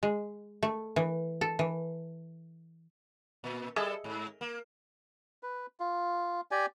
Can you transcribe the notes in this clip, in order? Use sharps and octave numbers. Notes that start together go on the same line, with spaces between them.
G#3
A3
E3
A4
E3
A#2
G3 G#4 A4 D#5 E5
G#2
A#3
B4
F4
G4 D5 G#5